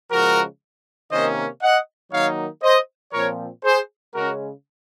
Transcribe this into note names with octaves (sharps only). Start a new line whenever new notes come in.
C#3 F3 G#3 F#4 A#4
C3 D#3 A#3 C#4 C5 D#5
D#5 F#5
D#3 F#3 A#3 D#4 C#5 F5
C5 D#5
A#2 F3 C4 A#4 C#5
G#4 C5
C#3 G#3 C#4 F#4 A#4